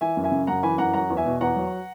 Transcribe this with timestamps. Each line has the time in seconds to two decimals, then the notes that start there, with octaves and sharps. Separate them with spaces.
0.01 E3 E5 G#5
0.17 F#2
0.24 E5 G#5
0.31 C#3
0.47 F#2 F#5 A#5
0.63 E3 G#5 B5
0.78 F#2 F#5 A#5
0.93 F#3 F#5 A#5
1.10 E2
1.17 E5 G#5
1.26 B2
1.41 E2 F#5 A#5
1.56 F#3